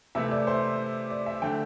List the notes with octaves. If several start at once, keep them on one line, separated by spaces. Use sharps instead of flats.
C3 E3 A3 E5
D5
C5
D5
E5
D3 A3 G5